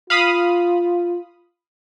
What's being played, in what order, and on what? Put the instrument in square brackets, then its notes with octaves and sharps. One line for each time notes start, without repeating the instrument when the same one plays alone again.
[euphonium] F4 [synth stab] F5 B5 D#6